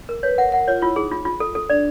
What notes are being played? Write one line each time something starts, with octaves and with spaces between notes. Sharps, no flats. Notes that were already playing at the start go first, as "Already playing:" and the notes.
A#4
B4 C#5
A#4 F#5
A#4 F#5
F4 C#5
E4 F4
D#4 G#4
F4
F4
A4
A4
D4 D5